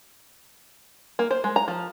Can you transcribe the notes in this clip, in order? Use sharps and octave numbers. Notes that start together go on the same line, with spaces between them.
A#3
C5
G#3
A#5
F3